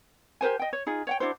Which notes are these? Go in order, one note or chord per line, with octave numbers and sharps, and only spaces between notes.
G4 A#4 C5 G#5
D#5 G5
C#5
D#4 F4 G#4
C#5 F#5 G5
D4 E4 F#4 C5